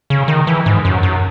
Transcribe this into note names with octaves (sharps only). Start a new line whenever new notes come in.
C#3
D#3
E3
G#2
F#2
F#2